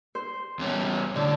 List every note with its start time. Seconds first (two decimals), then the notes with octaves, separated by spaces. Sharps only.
0.15 C5
0.59 E2 C#4
1.15 A2 D3